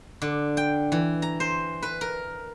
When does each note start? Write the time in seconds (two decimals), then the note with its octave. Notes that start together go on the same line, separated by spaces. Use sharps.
0.22 D3
0.57 G5
0.92 E3
1.22 A#5
1.40 C5
1.82 B4
2.01 A#4